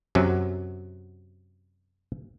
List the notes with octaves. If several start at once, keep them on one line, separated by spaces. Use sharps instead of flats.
F#2 C3 F#3